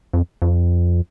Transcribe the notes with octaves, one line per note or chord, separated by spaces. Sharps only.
F2
F2